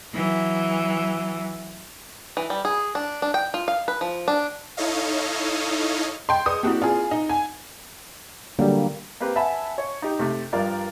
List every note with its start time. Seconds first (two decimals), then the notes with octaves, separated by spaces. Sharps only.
0.14 E3 F#3
2.37 E3
2.50 G3
2.65 G#4
2.95 D4
3.22 D4
3.34 G5
3.54 F4
3.68 F5
3.88 B4
4.01 F3
4.28 D4
4.77 D#4 E4 A4 C#5 D#5 F5
6.29 D#5 G5 C6
6.46 G#4 B4 D5 D#6
6.63 A#3 C4 E4 F#4 G4
6.82 F4 G#4
7.11 D#4
7.29 F#5 G#5
8.59 D3 F#3 G3 A#3 D4
9.20 A#3 C4 G4 B4
9.36 E5 F#5 G#5 A5 B5
9.78 C#5
10.02 D#4 G4
10.19 C3 A3
10.53 G2 F3 A#4 D5 F5